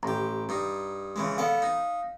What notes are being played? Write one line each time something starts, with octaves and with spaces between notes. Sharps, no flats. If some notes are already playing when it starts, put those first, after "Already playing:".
A1 G4 A#5
G2 D#4
C#3 E3 G#3
B3 A4 D5 F5
D#4